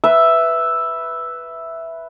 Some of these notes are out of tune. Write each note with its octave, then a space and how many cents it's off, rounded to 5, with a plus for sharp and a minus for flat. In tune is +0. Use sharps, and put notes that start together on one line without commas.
B4 +0 E5 +0